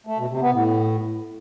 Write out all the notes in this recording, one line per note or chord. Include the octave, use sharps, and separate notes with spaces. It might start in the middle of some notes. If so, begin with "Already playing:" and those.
A3
B2
C3
B3
A2